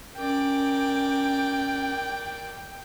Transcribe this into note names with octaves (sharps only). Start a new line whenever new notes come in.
C#4 A#4 D5 G5